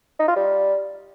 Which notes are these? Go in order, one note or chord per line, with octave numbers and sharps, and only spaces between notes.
D#4
F4
G3